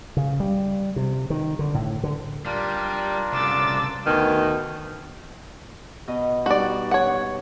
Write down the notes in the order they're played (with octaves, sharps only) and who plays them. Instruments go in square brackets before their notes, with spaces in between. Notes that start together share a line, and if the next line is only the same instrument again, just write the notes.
[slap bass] C#3
G3
C3
D#3
D3
A2
D3
[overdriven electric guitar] G3 [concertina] D4 F4 A#4
[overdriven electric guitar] C2 C#3 [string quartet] D6 E6 A6
[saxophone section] D2 B2 D#3
[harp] B2 D#5
[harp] G3 D#4 [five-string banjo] F#4 D5
[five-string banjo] C#5 F#5